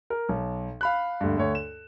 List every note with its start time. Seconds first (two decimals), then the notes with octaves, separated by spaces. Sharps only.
0.10 A#4
0.29 B1
0.81 F5 B5 F#6
1.21 D2 G2
1.38 D2 C#5
1.55 E7